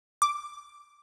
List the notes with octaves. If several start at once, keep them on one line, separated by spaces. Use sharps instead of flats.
D6